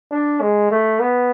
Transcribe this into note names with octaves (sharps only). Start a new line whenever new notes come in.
D4
G#3
A3
B3